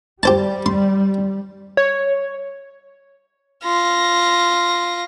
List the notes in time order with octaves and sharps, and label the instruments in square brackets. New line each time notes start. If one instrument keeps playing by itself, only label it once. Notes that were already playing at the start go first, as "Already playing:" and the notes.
[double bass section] G3 [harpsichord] G4 C5 A5
[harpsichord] C6
[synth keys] C#5
[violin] F4 A#6